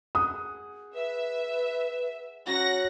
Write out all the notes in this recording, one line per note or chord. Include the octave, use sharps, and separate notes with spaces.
G#4 F#5 D#6
B4 E5
F#3 C#4 F#4 F#5 A#6